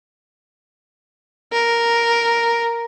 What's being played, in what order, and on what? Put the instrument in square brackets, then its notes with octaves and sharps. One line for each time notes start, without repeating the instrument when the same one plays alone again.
[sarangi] A#4